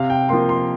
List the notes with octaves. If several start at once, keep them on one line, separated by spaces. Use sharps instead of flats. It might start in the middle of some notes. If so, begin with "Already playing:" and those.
Already playing: C3 F5
G5
F3 A#3 C6
C6